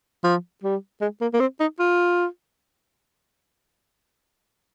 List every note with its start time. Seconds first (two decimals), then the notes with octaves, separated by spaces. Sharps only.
0.24 F3
0.64 G3
1.01 G#3
1.21 A#3
1.34 A#3
1.40 C4
1.60 D#4
1.79 F4